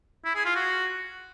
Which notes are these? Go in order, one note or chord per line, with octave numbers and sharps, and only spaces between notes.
E4
G#4
F4
F#4